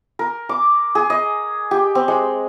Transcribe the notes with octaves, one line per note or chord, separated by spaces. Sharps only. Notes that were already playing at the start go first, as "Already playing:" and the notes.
A#4
D6
G#4
D#5
G4
C4
G#3